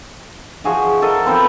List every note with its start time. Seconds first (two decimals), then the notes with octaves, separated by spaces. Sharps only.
0.64 F3 F#4 G#4 E5
1.02 A4 A#4 D#5
1.26 F3 B3 C4 C5